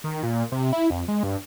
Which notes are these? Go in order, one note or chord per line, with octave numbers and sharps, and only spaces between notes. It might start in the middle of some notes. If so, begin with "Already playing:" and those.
D#3
A#2
C3
E4
F2
G#3
G2